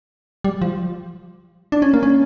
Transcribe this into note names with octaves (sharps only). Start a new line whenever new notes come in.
G3
F3
D4
C#4
A#3
C#4